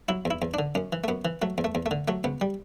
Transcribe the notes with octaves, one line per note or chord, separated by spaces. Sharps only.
F#3 E4
E2
E4
E2
D3 D4
F#2 C#4
E3
A3
F#2 B3
E3
F#3 A3
E2
A3
E2
A3
D3
F#3 A3
C#2 B3
G3